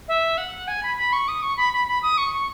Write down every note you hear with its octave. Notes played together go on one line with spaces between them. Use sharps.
E5
F#5
G#5
B5
B5
C#6
D#6
C#6
B5
B5
B5
D#6
C#6
C#6